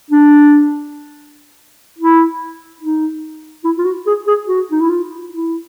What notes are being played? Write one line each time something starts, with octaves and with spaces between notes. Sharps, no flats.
D4
E4
D#4
E4
F4
F#4
G#4
G#4
F#4
D#4
E4
F4
E4